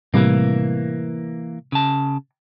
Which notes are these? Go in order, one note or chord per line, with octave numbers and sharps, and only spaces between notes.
A2 C3 E3 G3 A#3
C#3 A5